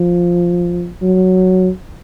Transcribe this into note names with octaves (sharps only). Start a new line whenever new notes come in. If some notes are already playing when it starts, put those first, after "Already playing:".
Already playing: F3
F#3